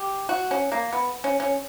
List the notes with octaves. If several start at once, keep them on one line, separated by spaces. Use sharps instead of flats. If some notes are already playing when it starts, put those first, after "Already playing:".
Already playing: G4
F#4
C#4
A#3
B3
C#4
C#4